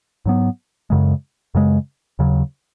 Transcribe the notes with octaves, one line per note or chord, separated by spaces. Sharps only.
G#2 F#3 B3
F#2 C#3 G#3
F#2 C#3 G#3
D#2 C#3 F#3